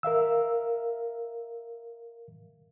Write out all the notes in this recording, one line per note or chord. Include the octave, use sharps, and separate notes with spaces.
A#4 E5 F5 E6